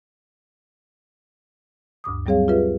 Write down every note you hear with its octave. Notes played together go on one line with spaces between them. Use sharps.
D2 G2 D6 D#6
F#3 G3 C4 G#4 C#5 F5
F4 G4 G#4 B4 E5